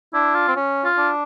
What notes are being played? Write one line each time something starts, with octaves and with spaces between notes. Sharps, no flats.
D4 E4
F4
C4
C#4
F4
D4